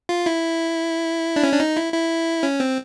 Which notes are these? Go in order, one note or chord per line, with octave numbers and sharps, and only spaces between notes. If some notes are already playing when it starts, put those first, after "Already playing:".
F4
E4
D4
C#4
D4
D#4
E4
E4
C#4
C4